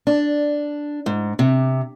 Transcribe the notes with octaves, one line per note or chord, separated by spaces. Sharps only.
D4
G#2
C3